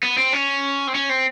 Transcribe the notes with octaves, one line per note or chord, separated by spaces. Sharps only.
B3
C4
C#4
C4
C#4
C4